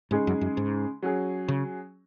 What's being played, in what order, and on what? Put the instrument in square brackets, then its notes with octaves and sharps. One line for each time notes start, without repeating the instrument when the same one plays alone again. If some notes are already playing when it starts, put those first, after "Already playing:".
[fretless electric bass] G#2 [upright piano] C#3 G#3 D#4 G#4
[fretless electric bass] F#2
F#2
G#2
[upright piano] F#3 C#4 G#4
[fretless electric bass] C#3